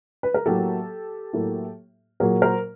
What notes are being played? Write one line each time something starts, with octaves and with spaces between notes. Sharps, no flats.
B4
A#4
A2 F#3 A#3 G4 A4
A2 F#3 A#3
A#2 F#3 A#3 G#4 A#4
A#4 C5